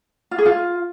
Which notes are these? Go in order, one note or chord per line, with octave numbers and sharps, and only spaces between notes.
F4
G#4
F4